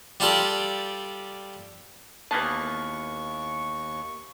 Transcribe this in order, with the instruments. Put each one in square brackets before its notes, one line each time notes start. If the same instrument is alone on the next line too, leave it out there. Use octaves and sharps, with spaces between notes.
[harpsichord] G3 F4 G4 A4 D5
[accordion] D#2 C#6 [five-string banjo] E3 A5 [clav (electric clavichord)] A#3 B3 G#4